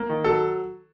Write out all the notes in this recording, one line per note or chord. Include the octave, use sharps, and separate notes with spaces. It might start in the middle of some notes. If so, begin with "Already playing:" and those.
Already playing: A#3
D#3
F#3 A4